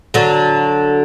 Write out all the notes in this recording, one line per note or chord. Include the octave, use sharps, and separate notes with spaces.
D3 F#3